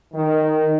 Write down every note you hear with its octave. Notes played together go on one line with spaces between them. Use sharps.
D#3